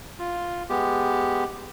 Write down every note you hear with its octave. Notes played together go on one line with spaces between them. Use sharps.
F4
G#3 B3 G4